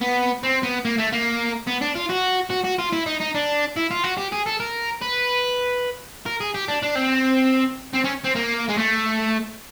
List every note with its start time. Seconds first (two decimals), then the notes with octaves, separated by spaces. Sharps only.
0.01 B3
0.43 C4
0.63 B3
0.85 A#3
0.98 A3
1.13 A#3
1.67 B3
1.82 D4
1.95 F4
2.10 F#4
2.51 F#4
2.65 F#4
2.79 F4
2.93 E4
3.06 D#4
3.21 D#4
3.35 D4
3.77 E4
3.91 F4
4.04 F#4
4.18 G4
4.32 G#4
4.46 A4
4.60 A#4
5.01 B4
6.26 A#4
6.40 G#4
6.54 G4
6.68 D4
6.82 D4
6.95 C4
7.93 C4
8.04 C#4
8.24 C4
8.35 A#3
8.68 G#3
8.77 A3